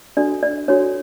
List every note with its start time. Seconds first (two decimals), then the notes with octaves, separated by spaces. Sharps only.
0.17 D4 F#4 A4 D5
0.43 D5
0.68 D4 F#4 A4 C#5